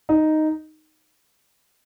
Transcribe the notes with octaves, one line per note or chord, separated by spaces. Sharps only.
D#4